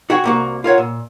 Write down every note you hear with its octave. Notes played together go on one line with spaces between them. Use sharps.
F#4 G#4 F#5 G5
C2 A#3 F#4
F4 A#4 C#5 F#5
A#2